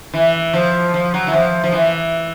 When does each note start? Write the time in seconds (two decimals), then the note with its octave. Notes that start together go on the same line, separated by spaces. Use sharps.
0.14 E3
0.54 F3
0.94 F3
1.14 F#3
1.27 E3
1.33 F3
1.64 F3
1.72 E3